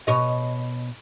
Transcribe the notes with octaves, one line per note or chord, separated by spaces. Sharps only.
B2 C#5 D#5